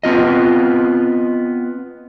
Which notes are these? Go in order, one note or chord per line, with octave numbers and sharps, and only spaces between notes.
B3 C4 F4 D#5